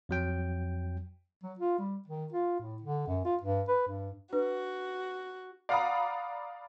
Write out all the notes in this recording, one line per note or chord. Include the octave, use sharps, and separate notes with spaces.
F2 F#3 G5
F#3
F4
G3
D#3
F4
A2
D3
F#2
F4
G2
B4
G2
D4 F#4 B4
D5 F5 F#5 A#5 B5 D#6